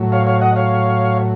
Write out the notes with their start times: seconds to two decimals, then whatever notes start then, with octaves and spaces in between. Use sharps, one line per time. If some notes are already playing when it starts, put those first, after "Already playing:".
Already playing: A2 F#3
0.12 C#5 F5
0.27 C#5 F5
0.41 D#5 F#5
0.56 C#5 F5